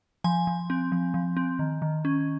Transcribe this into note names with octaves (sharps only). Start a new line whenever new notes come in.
F3 G#5
F3
C4
F3
F3
C4
D#3
D#3
C#4